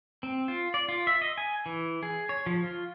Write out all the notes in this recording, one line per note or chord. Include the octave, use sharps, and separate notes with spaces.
C4
F4
D5
F4
E5
D#5
G#5
E3
G#4
C#5
F3
F4